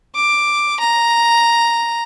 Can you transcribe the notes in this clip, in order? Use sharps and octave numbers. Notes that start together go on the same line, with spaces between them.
D6
A#5